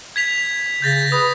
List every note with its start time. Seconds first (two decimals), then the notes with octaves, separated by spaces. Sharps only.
0.16 G#6 B6 F7
0.82 C#3 G6 A6 A#6
1.12 B4 D#6